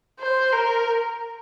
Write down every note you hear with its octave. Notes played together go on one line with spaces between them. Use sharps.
C5
A#4